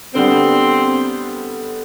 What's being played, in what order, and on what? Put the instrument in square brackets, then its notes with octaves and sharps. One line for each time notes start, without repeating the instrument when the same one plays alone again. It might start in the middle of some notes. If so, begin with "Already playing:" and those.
[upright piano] D3 G3 B3 [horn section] C4